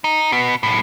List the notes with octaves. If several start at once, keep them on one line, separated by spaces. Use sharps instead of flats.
D#4
B2 B3
B1 A2